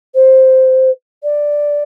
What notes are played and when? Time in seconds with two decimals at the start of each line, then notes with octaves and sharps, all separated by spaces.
0.15 C5
1.23 D5